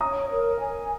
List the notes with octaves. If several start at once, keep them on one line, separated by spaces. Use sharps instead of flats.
C#5 A#5 D#6
A#4
G#5